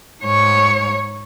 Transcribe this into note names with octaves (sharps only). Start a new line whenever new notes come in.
G#2 C#5